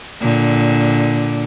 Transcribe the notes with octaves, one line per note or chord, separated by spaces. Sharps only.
A#2 D3